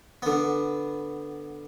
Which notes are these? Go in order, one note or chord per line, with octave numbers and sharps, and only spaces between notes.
D3 B3